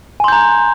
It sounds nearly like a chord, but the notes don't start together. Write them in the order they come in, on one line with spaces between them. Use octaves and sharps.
G#5 C6 G6 A#5